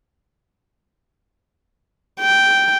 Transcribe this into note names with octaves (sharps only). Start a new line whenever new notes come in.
G5